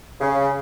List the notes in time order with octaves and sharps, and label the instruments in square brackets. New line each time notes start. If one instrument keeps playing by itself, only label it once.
[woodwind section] C#3